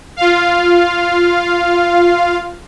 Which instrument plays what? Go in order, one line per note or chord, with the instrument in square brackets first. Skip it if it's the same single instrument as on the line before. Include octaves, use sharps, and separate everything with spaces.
[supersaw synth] F4 F5